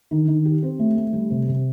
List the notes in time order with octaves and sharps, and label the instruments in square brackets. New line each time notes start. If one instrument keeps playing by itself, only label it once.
[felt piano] D#3
D#3
G4
C4
A3
A3
G3
C3
C3